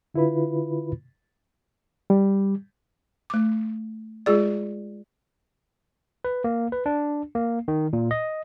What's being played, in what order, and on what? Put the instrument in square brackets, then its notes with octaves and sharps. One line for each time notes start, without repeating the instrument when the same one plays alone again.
[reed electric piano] D3 E4 F4 B4 B5
G3
[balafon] A3 D6
G#3 F4 G#4 D5
[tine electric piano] B4
A#3
B4
D4
A#3
D#3
A#2
D#5